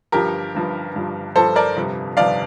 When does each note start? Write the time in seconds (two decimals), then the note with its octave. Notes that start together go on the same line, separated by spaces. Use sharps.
0.12 G1 G2 F3 G4 A#4
0.54 G1 G2 F3
0.95 G1 G2 F3
1.35 G1 G2 F3 A4 C5
1.56 A#4 D5
1.76 G1 F2 C3 G3
2.17 G1 F2 C3 G3 D5 F5